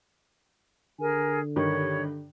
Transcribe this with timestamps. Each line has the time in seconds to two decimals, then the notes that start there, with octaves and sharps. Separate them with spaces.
0.99 D3 G#4 A#4 G#5
1.56 G2 D#3 C#5